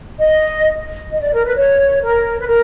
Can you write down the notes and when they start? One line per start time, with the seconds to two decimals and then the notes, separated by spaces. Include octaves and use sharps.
0.18 D#5
1.11 D#5
1.21 D5
1.33 A#4
1.44 B4
1.56 C#5
2.02 A#4
2.40 B4
2.46 A#4